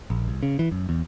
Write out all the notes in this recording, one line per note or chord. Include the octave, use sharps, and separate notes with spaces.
A#1
C2
C#3
E3
F#2
E2